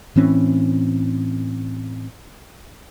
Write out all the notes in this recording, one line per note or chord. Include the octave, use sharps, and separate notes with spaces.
A2 E3 C4 C#4